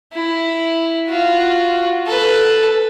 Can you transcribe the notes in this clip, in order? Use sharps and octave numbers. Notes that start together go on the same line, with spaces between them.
E4
F4 F#4
A4 B4